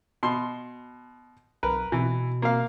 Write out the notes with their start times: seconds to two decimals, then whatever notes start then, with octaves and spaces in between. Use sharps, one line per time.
0.23 B2 C6
1.63 B1 A#4 B4
1.92 B2 E3
2.42 A#3 F5